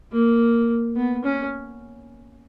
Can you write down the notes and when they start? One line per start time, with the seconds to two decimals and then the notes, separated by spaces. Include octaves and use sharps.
0.12 A#3
0.96 B3
1.24 C#4